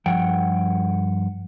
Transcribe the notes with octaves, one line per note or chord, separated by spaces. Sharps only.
G2 F3 F#5 G5